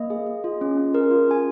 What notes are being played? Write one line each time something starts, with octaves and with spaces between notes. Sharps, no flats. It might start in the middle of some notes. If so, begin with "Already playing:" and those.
Already playing: A#3 D#5
G#4
G#4
F4
C#4
C#4
G#4 A#4
F4
C#4 G#5